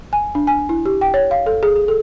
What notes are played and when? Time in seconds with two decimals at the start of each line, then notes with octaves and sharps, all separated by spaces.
0.13 G#5
0.35 D4
0.47 G#5
0.69 E4
0.86 G4
1.01 G5
1.14 C#5
1.31 F5
1.46 A4
1.63 G#4
1.76 G#4
1.88 A4